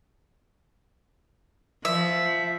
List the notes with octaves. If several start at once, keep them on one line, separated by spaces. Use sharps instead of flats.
F3 E5